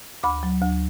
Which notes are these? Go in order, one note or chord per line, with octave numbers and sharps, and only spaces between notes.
D2 B5 D6
F#3
D2